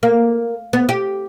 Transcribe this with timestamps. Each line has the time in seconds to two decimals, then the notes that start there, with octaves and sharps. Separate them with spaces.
0.03 A#3
0.73 B3
0.89 G4